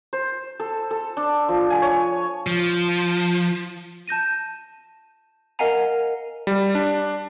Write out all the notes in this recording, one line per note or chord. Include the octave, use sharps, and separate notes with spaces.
C5
A4
A4
D4
F3
G#5
C#5
F3
A5 G6 A#6 D#7
A#4 D#5 F5 F#5 G#5 A#5
G3
D4